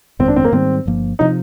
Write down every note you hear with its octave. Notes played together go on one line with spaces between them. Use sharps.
G1 F2 D#3 G#3 C4
D4
C4
A#3
G#2 D#3 G3 C4
G1 G2 F3 A#3
C3 F3 D#4